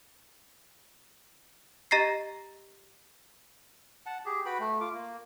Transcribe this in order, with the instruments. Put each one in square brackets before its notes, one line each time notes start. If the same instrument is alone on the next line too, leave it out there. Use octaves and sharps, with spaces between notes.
[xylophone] G4 D#5 A#5 A6 A#6 C7
[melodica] F#5 A5
G4 G#4
F#4 B4 G5 B5
A3
F4 D6
A#3